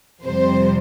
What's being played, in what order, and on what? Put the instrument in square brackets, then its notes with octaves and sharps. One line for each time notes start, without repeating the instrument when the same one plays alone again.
[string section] F2 C3 G3 C5